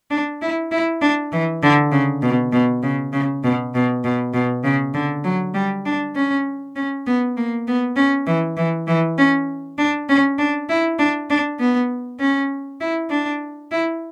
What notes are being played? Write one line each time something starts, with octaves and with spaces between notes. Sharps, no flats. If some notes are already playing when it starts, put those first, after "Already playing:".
D4
E4
E4
D4
E3
D3
C#3
B2
B2
C#3
C#3
B2
B2
B2
B2
C#3
D3
F#3
G3
D4
C#4
C#4
B3
A#3
B3
C#4
E3
E3
E3
C#4
D4
C#4
D4
E4
D4
D4
B3
C#4
E4
D4
E4